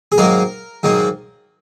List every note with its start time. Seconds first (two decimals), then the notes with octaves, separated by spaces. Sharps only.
0.12 G#4
0.18 G#2 D#3 F#3 A#3 A#4
0.83 G#2 D#3 F#3 A#3